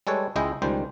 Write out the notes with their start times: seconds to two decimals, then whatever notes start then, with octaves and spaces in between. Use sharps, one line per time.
0.07 G3 G#3 A4 B4 C#5
0.36 C#2 G#3 E4 D#5 G5
0.62 C#2 D#3 G3 C5